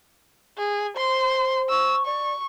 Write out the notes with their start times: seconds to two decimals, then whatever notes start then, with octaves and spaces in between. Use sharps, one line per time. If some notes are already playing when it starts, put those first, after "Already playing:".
0.58 G#4
0.97 C5 C6
1.69 C#6 E6
2.06 D5 C#6